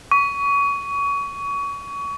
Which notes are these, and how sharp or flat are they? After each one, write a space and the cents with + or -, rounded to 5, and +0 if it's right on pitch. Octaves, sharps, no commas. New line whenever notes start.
C#6 +30